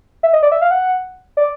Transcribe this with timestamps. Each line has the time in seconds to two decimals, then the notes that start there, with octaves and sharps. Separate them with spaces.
0.23 E5
0.33 D#5
0.43 D5
0.52 E5
0.61 F5
0.71 F#5
1.37 D5